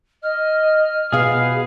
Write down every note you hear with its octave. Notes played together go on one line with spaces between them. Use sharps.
D#5 F6
B2 B3 G#4 B4 F5